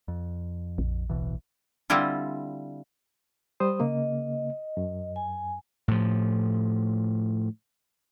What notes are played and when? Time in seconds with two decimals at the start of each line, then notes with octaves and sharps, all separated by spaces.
0.08 F2
0.78 A#1
1.10 D1 B2 E3
1.90 D3 G3 C4 E4 F4
3.60 G3 C5 D#6
3.80 C#3 A#3 D#5
4.77 F#2
5.16 G#5
5.88 A2 F3